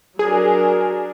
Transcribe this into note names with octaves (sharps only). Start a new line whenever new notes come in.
F#3 D4 G#4 A#4